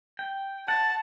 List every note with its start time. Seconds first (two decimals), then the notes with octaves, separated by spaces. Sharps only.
0.19 G5
0.68 F#5 A5 A6